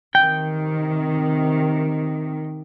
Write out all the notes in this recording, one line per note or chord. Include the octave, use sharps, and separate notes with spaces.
C3 D#3 G5